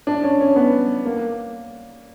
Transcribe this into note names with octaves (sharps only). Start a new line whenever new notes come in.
D4
C#4
C#4
B3
A#3